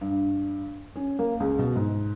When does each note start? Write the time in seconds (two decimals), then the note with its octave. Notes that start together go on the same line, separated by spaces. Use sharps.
0.01 G2
0.96 C#4
1.19 A#3
1.40 C#2
1.59 B2
1.76 G#2